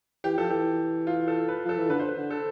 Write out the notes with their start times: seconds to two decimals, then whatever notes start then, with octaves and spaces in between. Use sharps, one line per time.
0.24 E3 G4
0.37 F3 A4
0.50 E3 G4
1.07 F4
1.28 A4
1.48 B4
1.65 F3 A4
1.78 E3
1.90 D3 B4
1.99 C5
2.08 B4
2.18 D3
2.30 A4